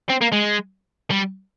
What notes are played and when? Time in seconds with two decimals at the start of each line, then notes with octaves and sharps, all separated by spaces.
0.10 C4
0.22 A#3
0.33 G#3
1.11 G3